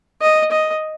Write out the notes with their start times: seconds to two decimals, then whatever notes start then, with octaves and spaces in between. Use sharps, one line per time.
0.22 D#5
0.51 D#5